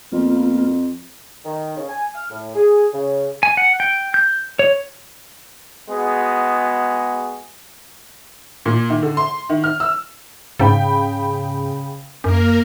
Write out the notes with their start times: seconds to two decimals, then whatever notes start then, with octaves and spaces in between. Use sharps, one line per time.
0.12 F2 A#3 B3 F4
1.45 D#3
1.77 C#3
1.89 G#5
2.15 F6
2.31 A2
2.55 G#4
2.93 C#3
3.43 G#5
3.57 F#5
3.80 G5
4.14 G6
4.59 C#5
5.89 G#3 B3 F#4 G#4
8.66 A#2
8.90 D#3
9.03 D3
9.17 C6
9.50 D#3
9.64 F6
9.80 E6
10.60 G#2 C#3 G5 B5
12.24 F#2 A#3 A#4